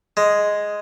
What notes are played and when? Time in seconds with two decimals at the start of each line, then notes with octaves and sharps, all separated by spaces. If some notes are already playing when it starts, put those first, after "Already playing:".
0.17 G#3